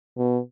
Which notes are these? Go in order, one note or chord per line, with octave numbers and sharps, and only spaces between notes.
B2